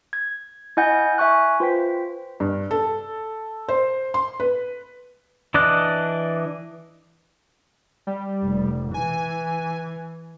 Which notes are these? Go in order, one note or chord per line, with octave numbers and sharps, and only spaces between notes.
G#6
E4 D#5 F#5 G#5 G6
E5 G#5 C#6 F#6
F4 B4 C5 G5 B6
G2
A4
C5
C6
B4
E3 D4 D5 D#5 F#6
G3
F1
E3 G#5